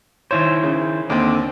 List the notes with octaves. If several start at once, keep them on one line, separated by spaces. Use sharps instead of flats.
D#3 E4 C5 C#5
C#3
D#2 D3 C4